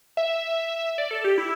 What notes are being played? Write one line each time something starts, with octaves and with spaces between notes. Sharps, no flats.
E5
D5
A4
G4
E4